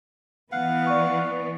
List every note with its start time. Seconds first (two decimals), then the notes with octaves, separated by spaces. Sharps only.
0.52 E3 B3 F5 F#5
0.87 D5 C#6